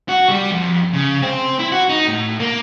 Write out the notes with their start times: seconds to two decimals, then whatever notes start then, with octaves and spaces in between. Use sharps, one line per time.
0.09 F#4
0.29 G3
0.51 F2
0.93 C#3
1.22 C4
1.59 E4
1.72 F#4
1.89 D#4
2.08 A2
2.40 A#3